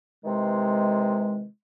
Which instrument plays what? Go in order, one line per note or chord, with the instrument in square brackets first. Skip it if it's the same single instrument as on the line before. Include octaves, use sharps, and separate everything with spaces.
[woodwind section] C3 D#3 E3 G#3